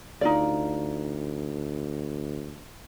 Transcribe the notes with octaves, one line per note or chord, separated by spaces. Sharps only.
D2 D#4 F4 D5